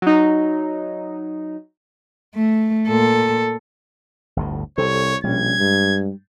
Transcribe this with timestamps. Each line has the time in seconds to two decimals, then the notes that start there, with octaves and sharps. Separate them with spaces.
0.02 F#3 D#4
2.35 A3
2.88 A#2 A4
4.37 G1 D2 A2
4.78 C2 C3 A4 C5 C#5
5.24 A#1 B2 G3 C#4 G#6
5.59 G2 G#3